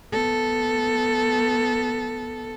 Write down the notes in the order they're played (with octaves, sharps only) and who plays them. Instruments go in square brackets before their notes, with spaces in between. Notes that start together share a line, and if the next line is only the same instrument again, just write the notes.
[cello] B3 A4